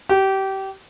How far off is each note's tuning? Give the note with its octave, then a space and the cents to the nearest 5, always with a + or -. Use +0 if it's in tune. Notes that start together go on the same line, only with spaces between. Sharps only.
G4 -25